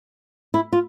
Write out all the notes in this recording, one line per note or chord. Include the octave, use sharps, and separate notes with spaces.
E4
F4